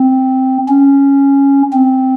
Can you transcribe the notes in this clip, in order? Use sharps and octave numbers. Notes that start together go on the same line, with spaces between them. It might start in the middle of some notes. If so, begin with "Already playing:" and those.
Already playing: C4
C#4
C4